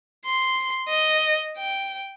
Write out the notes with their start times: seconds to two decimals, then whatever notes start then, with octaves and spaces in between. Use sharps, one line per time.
0.25 C6
0.88 D#5
1.57 G5